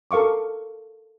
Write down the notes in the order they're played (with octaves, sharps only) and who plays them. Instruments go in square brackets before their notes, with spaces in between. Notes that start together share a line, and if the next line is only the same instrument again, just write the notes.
[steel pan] A4 A#4 F5 C#6 D6